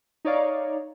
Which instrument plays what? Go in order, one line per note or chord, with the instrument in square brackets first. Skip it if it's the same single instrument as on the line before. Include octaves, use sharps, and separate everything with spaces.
[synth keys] D#4 C#5 D5 F5